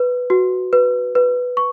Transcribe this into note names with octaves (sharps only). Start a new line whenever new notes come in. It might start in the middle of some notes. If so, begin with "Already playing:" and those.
Already playing: B4
F#4
B4
B4
C#6